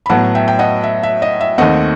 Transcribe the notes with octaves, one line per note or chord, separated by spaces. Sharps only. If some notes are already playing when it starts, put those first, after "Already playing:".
B5
A2 F#3 B3 F#5 A5
E5 G5
G5
D#5 F#5
E5
E5
D#5
E5
D#2 D#3 A3 C4 D#5 F#5